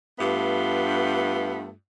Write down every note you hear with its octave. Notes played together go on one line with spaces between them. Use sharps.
G2 A3 B3 F4